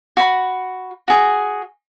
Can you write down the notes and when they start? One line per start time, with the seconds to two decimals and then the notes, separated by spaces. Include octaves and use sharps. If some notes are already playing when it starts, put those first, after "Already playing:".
0.17 F#4 B5
1.08 F#4 G#4